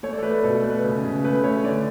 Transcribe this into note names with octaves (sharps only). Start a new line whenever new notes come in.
A3 C#5
D5
A4
A3 B4
B4
B2 A4
A3
B4
C#3
C#3
A3 B4
A3 C#5
D3 D5